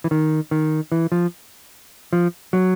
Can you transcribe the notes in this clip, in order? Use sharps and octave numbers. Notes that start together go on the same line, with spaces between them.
E3
D#3
D#3
E3
F3
F3
F#3